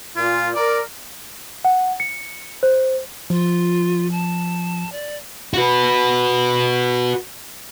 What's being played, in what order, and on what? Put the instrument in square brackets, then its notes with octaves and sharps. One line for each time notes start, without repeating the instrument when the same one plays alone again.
[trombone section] A#2 [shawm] F4
[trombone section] A#4 [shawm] D5
[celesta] F#5
C#7
C5
[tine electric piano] F3 [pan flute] F4
[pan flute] A5
D5
[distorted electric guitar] F#4 B4